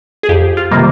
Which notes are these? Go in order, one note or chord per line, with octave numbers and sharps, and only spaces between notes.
G#4
F2 G4
F4
C3 D#3 G3 A#3